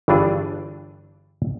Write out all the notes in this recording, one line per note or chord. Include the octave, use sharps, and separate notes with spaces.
G1 G2 E3 D4 G#4